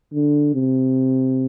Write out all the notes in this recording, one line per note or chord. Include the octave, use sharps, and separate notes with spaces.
D3
C3